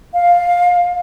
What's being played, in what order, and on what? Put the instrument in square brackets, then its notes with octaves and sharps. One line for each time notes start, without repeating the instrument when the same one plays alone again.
[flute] F5